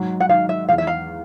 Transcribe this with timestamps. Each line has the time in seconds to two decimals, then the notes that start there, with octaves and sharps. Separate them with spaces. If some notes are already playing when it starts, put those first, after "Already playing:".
Already playing: G#2 F#3
0.20 F#5
0.29 D#3 F5
0.49 E5
0.68 E2 F5
0.78 E5
0.87 F5